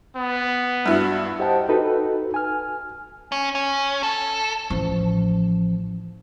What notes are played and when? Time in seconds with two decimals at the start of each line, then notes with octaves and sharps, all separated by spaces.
0.16 B3
0.86 G2 E4 F#4
1.39 G4 C5 D#5 F#5 G5 A5
1.69 D#4 F#4 A4 B4
2.34 G#5 F6
3.32 C#4
3.55 C#4
4.03 A4
4.70 A1 F3